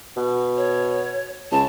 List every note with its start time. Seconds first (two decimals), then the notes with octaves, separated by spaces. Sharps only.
0.17 B2
0.57 C#5
1.52 C#2 A5